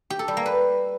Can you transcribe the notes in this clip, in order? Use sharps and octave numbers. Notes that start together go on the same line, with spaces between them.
G4
A4
G3
A#3
B4